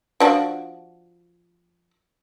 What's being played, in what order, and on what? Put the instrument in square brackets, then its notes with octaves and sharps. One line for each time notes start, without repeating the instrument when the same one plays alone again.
[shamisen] F3 D4 F#4